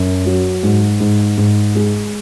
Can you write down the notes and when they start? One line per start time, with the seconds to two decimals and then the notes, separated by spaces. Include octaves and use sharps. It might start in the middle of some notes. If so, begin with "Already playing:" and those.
Already playing: F#2
0.25 F#3
0.63 G#2
1.00 G#2
1.38 G#2
1.75 G#3